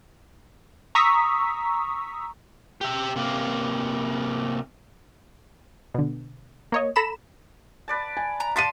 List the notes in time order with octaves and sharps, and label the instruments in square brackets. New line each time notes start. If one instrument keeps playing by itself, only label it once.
[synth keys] A#5 C#6 D#6 E6 B6
[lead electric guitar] G4 E5
C3 A#3
[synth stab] B2 D3
A#3 C#5 D#5
A4 A#5 B5 E7
[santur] B4 D5 A5
[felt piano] G#5
[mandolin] A#5
[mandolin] F5 A5 D6 [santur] C6 [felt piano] A6 B6 D#7